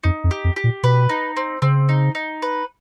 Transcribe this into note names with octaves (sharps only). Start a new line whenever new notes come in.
F2 D#4
F2
G4
F2
G4
A#2
B2 B4
D#4
C4
C#3 C4
D#4
D#4
B4